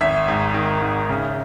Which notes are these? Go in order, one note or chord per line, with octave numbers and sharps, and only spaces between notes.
G#1 E5
G#2
D#3
G#2
C#3